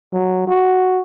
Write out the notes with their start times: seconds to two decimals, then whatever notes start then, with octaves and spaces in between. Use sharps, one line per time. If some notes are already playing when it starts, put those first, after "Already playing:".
0.13 F#3
0.47 F#4